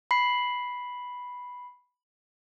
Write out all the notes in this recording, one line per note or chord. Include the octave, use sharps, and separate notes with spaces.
B5 C7